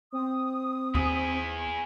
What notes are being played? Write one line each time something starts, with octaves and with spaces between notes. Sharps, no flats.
C4 D#6
D#2 E4 G#4